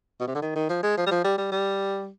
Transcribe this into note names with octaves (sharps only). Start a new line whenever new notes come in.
B2
C3
D3
D#3
D#3
F3
G#3
F3
G3
F3
G3
G3
G3